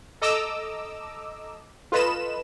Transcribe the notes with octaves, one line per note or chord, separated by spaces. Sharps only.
A4 D#5 A#5 D6 E6
F4 A4 B4 D#5 B5 E7